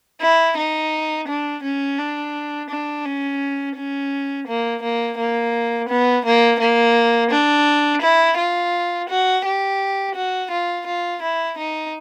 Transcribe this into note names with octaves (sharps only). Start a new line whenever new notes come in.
E4
D#4
D4
C#4
D4
D4
C#4
C#4
A#3
A#3
A#3
B3
A#3
A#3
D4
E4
F4
F#4
G4
F#4
F4
F4
E4
D#4